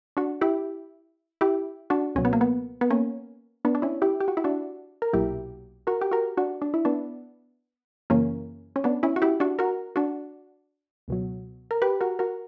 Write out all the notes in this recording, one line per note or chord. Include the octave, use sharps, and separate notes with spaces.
D4 F#4
E4 G4
E4 G4
D4 F#4
C#2 B2 F#3 C#4
B3
A#3
B3
B3
A#3 C#4
B3 D4
D4
C#4 E4
E4 G4
G4
F#4
E4
D4 F#4
A#4
B1 A#2 F#3 E4 G4
F#4 A#4
G4
F#4 A#4
D4 F#4
D4
E4
B3 D4
F#2 C#3 E3 A#3 C#4
C#4
B3 D4
C#4 E4
F#4
E4 G4
D4 F#4
F#4 A#4
D4 F#4
C#2 B2 F#3
A#4
G4 B4
F#4 A#4
F#4 A#4